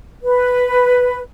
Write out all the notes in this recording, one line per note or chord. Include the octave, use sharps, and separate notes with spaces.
B4